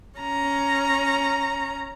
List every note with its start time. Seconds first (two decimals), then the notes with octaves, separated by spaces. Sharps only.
0.19 C#4 A#5